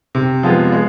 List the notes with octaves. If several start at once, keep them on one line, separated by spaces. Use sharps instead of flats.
C3
F3 G#3 B3 F4
G#3